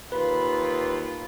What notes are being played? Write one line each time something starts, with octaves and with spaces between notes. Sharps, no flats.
D#2 F4 B4 B5